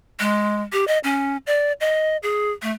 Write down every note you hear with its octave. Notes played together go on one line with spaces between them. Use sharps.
G#3
G4
D#5
C#4
D5
D#5
G#4
A3